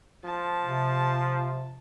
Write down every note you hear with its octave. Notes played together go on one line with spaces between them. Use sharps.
F3 A5
C3